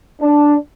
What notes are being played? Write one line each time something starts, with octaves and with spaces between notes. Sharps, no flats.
D4